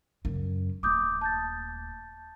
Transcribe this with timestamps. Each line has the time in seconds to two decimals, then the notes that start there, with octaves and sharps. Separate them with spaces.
0.25 F#2 C#3
0.83 D#1 A3 D6 D#6 G6
1.21 A5 G6 A6